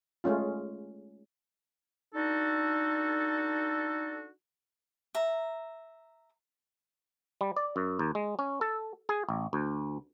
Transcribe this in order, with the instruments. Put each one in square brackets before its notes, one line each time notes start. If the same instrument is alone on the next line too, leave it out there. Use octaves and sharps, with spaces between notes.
[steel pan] G#3 A3 C#4 F4
[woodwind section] D4 D#4 F#4 A4
[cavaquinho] E5 A#5
[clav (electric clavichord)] G3
D5
F#2
D#2
G#3
C#4
A4
G#4
A1
D2